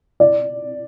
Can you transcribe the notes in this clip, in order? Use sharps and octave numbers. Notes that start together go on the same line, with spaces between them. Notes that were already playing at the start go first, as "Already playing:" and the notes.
D5